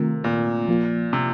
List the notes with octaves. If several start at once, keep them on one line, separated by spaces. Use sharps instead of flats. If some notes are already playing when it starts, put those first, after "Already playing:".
Already playing: C3 D#3 A3 C4 F4 A#4
A#2
F3 A#3 F4
C3